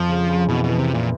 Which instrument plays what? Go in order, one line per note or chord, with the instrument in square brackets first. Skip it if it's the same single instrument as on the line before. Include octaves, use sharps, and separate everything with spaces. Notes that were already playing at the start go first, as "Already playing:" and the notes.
Already playing: [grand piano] F2 [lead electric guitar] F3
[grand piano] C#3
C#3
[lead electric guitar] B2 [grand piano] E3
[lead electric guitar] B2
[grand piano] E3
[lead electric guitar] C3
[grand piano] E3
[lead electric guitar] A#2